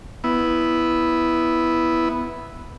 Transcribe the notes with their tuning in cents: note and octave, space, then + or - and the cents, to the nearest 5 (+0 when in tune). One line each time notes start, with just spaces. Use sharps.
B3 +0 E4 +0